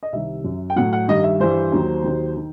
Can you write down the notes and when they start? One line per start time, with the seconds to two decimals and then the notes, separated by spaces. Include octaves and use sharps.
0.03 D#5
0.13 C2 C3 D#3 G3 E5
0.44 F#2 F#3
0.70 G5
0.76 A2 F#3 F#5
0.93 F#5
1.08 G2 D#3 G3 D#5
1.24 E5
1.40 G2 E3 G3 C5
1.72 D#2 D#3 F#3
2.04 D#2 D#3 F#3
2.37 D#3